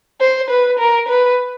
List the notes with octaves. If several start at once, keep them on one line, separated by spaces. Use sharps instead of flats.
C5
B4
A#4
B4